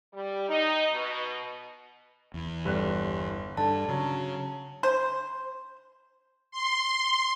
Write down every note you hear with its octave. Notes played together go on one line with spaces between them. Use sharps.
G3
D#4
B2
E2
G1 G3 F#6
G2 D3 A5
C#3 F#3
C5
C6